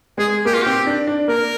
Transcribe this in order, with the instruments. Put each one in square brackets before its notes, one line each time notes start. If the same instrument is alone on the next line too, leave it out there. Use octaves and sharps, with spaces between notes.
[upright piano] G#3 [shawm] G#4
[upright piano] A#3 [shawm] G4
[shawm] F4
[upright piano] C4 [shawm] G4
[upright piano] D4
D4
[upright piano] A#3 [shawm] A#4